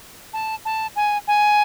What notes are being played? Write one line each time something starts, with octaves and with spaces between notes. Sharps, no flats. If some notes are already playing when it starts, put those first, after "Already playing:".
A5
A5
G#5
G#5